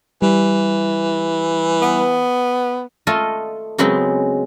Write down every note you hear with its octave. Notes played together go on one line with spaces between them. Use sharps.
E3 G3
B3
A3 F4 A4 D#5
C#3 F#3 G#3 B3 C4